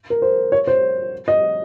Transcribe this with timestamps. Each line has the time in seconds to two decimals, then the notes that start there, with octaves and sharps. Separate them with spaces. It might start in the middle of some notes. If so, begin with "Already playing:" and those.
0.10 A#4
0.22 C5
0.52 C#5
0.67 C5
1.28 D#5